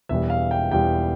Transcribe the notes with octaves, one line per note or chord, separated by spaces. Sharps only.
E1 E2 E3 G3 E5
F5
G5
E1 E2 E3 G3 G5